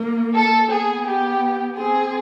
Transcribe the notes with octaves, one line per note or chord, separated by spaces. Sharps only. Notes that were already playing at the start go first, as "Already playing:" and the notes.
Already playing: A#3
A4
B3 G#4
G4
C4 G#4